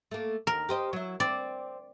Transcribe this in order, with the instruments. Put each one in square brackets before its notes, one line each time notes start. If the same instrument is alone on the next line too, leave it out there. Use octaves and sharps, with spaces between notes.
[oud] A3 A#3
[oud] D#2 [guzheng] A#4
[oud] G4 C5 D#5
F#3 E4
[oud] C4 [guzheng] D5